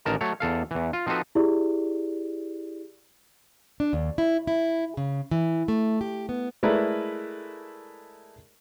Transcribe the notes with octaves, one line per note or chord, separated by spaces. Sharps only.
A1 D#3 A#4 A5
F#3 A3 C#5
E2 A4 F5
E2 E3
F4
F3 C4 D#4 F#4 A4 B4
E4 G4 G#4 D5
D4
D#2
E4
E4
C#3
E3
A3
G4
B3
G#3 A3 E4 A#4 B4 D5